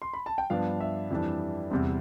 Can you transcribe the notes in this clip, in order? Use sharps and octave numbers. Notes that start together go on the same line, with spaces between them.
C6
B5
A5
G5
G2 F3 B3 D4 F5
E5
F2 E3 G3 D4
E2 C3 G3 C4